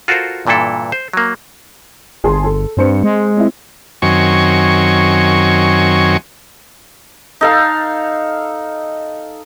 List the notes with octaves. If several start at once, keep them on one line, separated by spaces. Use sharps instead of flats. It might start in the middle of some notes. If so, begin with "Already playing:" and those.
F4 F#4 A4 A#4 C5 F5
G2 A#2 E3 E4 A4
C5
F#3 A#3
G1 G#4 A5 C6
A4
G2 C4 C5 C#7
G#3
C4 E4
F#2 D#3 F#3 C4 G#5 C#6
D#4 A4 F5